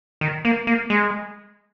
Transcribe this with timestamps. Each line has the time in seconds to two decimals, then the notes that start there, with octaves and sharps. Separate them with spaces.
0.21 D#3
0.45 A#3
0.67 A#3
0.90 G#3